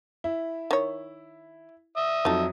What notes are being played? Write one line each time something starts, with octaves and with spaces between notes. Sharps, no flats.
E4
D#3 C#5
E5 D#6
F2 F#3 D#4 A4